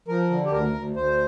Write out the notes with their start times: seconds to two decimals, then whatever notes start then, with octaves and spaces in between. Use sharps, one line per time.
0.08 F3 A#4
0.31 D3
0.46 G4
0.52 D2 A#4
0.74 D2
0.96 D2 C5